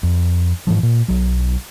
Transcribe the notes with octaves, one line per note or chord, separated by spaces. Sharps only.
F2
G#2 E3 F3
A#2
B1 F#3